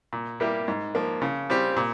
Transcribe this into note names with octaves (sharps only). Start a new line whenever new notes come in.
A#2
G3 A#3 E4 G4
G#2
F3 A#3
C#3
G3 C4 G4
A#2